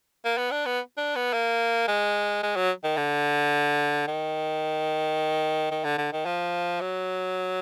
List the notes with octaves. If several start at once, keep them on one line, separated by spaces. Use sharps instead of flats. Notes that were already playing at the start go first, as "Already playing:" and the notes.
A#3
B3
D4
B3
D4
B3
A#3
G#3
G#3
F#3
D#3
D3
D#3
D#3
D3
D3
D#3
F3
F#3